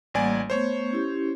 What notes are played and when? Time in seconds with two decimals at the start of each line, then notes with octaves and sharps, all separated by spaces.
0.14 A1 G3 A#3 D5 F#5 G#5
0.50 A3 B3 C5 C#5 C#6
0.91 C#4 E4 G4